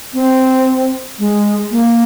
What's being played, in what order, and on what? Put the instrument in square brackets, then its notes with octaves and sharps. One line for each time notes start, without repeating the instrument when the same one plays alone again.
[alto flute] C4
G#3
A#3